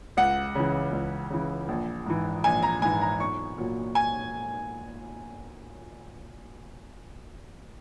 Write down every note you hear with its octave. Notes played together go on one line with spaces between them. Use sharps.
C#2 F#5
C#3 E3
C#2
C#3 E3
A#1
G#2 E3
A#1 G#5
A#5
G#2 E3 G#5
A#5
B1 C#6
A#2 F#3
G#5